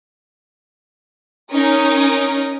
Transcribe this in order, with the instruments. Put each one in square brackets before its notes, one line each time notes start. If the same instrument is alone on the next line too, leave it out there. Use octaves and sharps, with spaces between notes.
[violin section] C#4 D#4 A#4